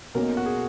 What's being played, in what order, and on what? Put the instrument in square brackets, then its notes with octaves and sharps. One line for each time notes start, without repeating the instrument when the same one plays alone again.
[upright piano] B1 B2 A#3 C#4 [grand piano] A#4
[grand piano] F#4
G#4